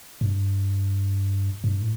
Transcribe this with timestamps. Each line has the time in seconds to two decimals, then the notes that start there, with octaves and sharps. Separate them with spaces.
0.21 G2
1.64 G2
1.81 A2